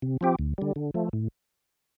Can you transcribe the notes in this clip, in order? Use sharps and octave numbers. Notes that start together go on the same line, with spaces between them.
C3
F3 C4 G4
D2
D3 G3
D3
F3 A3
A2